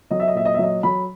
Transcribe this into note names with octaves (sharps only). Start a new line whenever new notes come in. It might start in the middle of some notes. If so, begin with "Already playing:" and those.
F#3 D#5
E5
D#5
A#2 E5
D#5
E5
F#3 D#5
F#3 B5